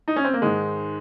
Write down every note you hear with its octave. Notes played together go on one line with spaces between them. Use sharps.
D#4
C#4
C4
A#3
G#2 D#3 G#3